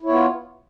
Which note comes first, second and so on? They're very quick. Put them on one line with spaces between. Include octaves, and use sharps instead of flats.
E4 C#5 B3 F4